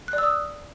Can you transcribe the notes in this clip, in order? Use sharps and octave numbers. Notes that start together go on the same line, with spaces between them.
F#6
D5
E6
D#6